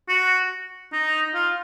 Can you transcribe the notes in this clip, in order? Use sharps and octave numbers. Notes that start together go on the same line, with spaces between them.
F#4
D#4
F4